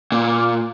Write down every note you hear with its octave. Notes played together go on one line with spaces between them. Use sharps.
A#2